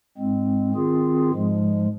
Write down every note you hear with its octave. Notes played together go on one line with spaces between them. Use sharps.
G#2 G#3 C4
D#3 C4 F4 G#4
G#2 F3 G#3